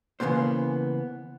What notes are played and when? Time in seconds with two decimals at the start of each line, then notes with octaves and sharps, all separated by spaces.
0.20 C#3 E3 A#3 B3 C5